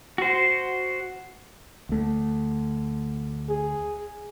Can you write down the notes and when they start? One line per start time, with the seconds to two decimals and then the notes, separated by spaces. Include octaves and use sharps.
0.18 F#4 C5
1.89 D2 A3
3.49 G#4